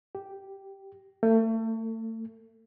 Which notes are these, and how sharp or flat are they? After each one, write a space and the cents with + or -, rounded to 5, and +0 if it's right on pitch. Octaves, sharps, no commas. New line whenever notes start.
G4 -5
A3 +35